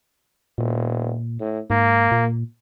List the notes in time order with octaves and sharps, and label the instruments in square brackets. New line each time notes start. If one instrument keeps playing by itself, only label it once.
[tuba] E1 [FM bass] A#2
[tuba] A2
[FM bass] G#2 [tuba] A#3
[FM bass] A#2